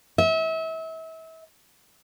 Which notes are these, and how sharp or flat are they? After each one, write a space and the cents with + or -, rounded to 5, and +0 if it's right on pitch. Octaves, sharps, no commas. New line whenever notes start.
E5 -35